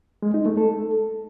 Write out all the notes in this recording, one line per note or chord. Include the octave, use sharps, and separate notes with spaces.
G#3
D#4
A3
A4